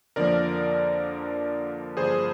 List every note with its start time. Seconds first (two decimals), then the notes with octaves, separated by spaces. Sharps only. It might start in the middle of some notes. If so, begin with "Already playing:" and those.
0.16 F2 D3 F3 A#3 A#4 D5
1.97 G2 D3 F3 A#3 G#4 C5